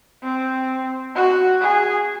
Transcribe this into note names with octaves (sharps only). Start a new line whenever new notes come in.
C4
F#4
G#4